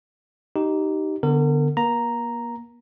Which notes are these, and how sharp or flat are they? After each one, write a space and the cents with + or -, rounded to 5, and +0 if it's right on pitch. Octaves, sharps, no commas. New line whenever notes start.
D#4 +0 G4 -20
D3 +0 B3 +0 A#4 -40
A#3 +35 A#5 +0